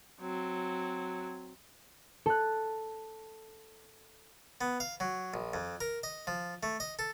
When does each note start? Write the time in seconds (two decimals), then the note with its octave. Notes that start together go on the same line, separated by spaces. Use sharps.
0.20 F#3 C4
2.26 A4 F#6
4.61 B3
4.80 F5
5.00 F#3
5.34 A#1
5.54 F2
5.81 A#4
6.03 D#5
6.27 F3
6.63 A3
6.80 D#5
6.99 A4